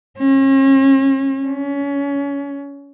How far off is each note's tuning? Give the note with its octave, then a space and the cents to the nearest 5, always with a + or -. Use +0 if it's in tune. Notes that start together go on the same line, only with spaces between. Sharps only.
C#4 -40
C#4 +25